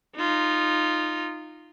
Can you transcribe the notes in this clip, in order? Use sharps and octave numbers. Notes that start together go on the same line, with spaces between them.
D#4 F4